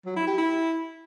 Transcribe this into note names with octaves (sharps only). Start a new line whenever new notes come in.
F#3
E4
G4
E4